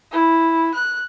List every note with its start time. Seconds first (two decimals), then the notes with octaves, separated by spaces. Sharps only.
0.12 E4
0.74 F#6